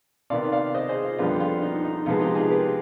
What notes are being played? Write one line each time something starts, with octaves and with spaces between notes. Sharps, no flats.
C3 D#3 B3 D5 F5
D5 F5
C5 D#5
G#4 C5
F4
F2 D3 G3 B3 F4
F4
D#4
D#4
C3 F3 G#3 B3 F4
D#4 G4
F4 G#4
G4 B4